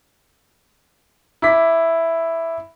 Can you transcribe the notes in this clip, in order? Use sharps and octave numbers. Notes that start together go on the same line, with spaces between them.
E4 D6 B6